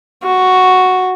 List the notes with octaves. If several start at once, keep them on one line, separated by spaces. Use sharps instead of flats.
F#4